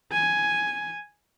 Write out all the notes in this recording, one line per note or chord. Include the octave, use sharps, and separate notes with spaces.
G#5